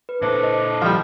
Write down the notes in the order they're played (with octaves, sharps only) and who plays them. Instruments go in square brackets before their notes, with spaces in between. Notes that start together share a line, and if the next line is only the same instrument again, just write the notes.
[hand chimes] B4
[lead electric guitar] A#2 A4 [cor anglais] D4 [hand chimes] C5 E5
[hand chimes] D#5
[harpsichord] F3 G3